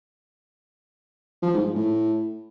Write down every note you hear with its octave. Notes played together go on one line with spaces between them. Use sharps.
F3
G#2
G#2
A2